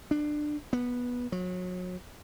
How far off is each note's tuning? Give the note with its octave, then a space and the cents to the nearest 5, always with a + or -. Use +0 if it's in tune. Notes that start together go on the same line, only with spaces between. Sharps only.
D4 +20
B3 -10
F#3 -30